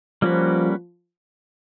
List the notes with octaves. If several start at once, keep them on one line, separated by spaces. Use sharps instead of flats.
F3 G3 A#3 C#4 F#4 B4